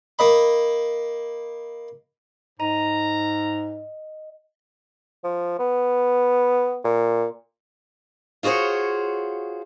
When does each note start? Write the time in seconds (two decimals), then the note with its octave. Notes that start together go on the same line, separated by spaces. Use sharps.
0.19 A#3 D#5 B5
2.60 G#2 D#5 A#5
5.24 F3
5.59 B3
6.85 A#2
8.43 F4 F#4 G#4 C5 C#5